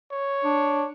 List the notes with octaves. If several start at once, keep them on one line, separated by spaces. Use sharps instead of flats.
C#5
D4